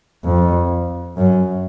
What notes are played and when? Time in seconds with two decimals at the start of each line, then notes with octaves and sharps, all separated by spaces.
0.24 F2
1.17 F#2